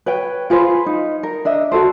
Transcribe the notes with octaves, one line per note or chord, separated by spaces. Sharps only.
B4 C#5 G5
F4 G#4 B4 C5
D#4
A#4
D4 D#5 E5
F#4 A4 C5